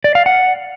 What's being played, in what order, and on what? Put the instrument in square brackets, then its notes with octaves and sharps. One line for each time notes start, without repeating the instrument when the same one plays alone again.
[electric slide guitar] D5
F5
F#5